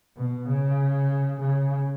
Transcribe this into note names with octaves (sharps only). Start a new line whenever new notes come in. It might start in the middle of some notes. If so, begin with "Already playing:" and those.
B2
C#3
C#3